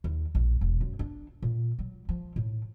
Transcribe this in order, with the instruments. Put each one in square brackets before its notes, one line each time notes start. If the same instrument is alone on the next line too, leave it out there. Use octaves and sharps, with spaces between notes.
[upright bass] D#2
A#1
E1
F#2
D4
A#2
F#3
F3
A2